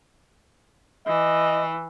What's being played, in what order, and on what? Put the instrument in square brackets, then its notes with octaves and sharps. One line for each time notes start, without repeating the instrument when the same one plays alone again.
[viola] E3 [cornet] D#5